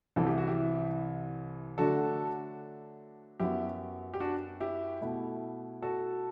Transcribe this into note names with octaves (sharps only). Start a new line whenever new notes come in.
C2 C3 E3 A4
G4
F#4
E4 G4
D3 F#3 A3 D4 F#4 A4
F#2 F#3 B3 E4 G4
G4
D4 F#4
E4 G4
B2 A3 E4
F#4 A4